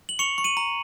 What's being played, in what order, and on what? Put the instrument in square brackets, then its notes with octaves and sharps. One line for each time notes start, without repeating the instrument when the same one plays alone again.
[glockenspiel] F#7
C#6 C#7 F7
C#6
D#7 F#7
A#5